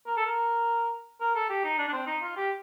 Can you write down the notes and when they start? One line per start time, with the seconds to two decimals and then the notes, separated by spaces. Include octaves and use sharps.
0.06 A#4
0.17 A4
0.26 A#4
1.21 A#4
1.35 A4
1.49 G4
1.64 D#4
1.78 D4
1.88 D4
1.93 C4
2.07 D#4
2.22 F4
2.37 G4